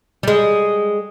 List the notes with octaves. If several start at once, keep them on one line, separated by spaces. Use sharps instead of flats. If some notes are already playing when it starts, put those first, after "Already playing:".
G3 G#3